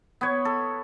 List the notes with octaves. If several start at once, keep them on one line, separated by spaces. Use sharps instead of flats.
B3 C#5
A4